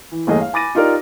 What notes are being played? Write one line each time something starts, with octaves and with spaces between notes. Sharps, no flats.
E3
G1 E2 A3 A#3 G#4 D#5
F5
G#5 B5 D6 A6 A#6 D#7
D#4 F4 G4 A#4 D5